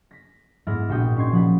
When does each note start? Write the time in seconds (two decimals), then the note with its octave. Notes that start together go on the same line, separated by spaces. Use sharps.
0.11 A#6 B6
0.67 G#2 B3 E4 F6 A#6
0.89 A#1 F#4 G5 D#6
1.16 C#4 D#4 C6 G#6
1.32 F3 F#5 B5